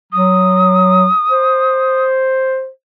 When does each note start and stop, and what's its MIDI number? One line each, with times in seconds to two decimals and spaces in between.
0.13 1.07 54
0.13 2.04 87
1.31 2.69 72